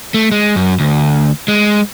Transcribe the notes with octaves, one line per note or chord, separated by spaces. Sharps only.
A3
G#3
F#2
D2
G#3